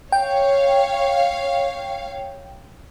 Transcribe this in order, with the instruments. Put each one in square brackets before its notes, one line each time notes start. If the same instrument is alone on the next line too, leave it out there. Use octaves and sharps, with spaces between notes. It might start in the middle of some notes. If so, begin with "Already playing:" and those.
[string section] C#5 F5 [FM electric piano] G5